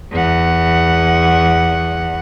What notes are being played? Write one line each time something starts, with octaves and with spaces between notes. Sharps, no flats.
E2 F#5